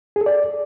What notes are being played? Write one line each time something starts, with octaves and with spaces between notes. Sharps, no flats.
G#4
A4
D5